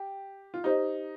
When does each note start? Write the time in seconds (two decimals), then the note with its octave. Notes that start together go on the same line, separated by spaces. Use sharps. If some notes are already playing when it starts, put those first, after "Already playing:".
Already playing: G4
0.54 F4
0.64 D#4 G4 C5 D#5